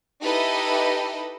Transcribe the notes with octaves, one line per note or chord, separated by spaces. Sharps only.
D#4 E4 G4 A4 B4 D#5